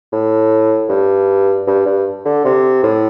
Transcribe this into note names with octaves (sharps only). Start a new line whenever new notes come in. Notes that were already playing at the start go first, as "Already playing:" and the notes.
A2
G2
G2
G2
D3
C3
A2